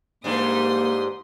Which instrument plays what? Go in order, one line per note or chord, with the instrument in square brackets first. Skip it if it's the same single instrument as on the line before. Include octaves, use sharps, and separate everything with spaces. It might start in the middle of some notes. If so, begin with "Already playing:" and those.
[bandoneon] G#2 [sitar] E3 G3 D4 [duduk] A#3 [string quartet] C6 D#6